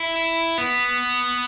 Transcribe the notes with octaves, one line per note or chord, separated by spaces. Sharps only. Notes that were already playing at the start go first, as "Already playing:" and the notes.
Already playing: E4
B3